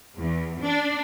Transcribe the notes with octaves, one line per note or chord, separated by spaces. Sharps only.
E2
D4